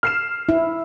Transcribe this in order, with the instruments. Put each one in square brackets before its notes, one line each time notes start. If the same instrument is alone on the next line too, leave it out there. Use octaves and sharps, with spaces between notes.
[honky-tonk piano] F6 C7 E7
[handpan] E4